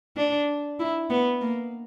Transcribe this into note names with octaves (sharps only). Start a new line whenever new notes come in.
D4
E4
B3
A#3